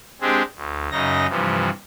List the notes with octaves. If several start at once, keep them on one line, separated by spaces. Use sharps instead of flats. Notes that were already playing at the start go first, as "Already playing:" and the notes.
G#3 C4 D4 G4 G#4
D2
F#2 C#3 D#4 A#6
G2 C3 E3 F3